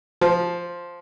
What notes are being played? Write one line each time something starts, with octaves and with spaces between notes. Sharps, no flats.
F3